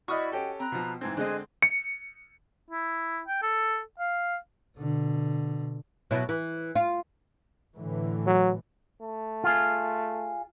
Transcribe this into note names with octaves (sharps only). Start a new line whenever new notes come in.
E4 F#4 D5 D#5 B5 C#6 D#6 F6
C#4 G4 A4 G5
C4 A#5 B5 F#6
B2 F3
G#2 E3 C4 G#6
D3 G#3 C4 G#4 C5 D#5 F#6
C#7
E4
G5
A4
F5
B2 D3
B2 F#3 E4
E3
F4
A2 D3 E3
F#3
A3
F4 G#4